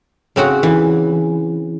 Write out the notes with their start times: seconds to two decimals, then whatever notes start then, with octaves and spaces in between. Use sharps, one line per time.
0.36 C#3 C4 F#4 F#5
0.63 E3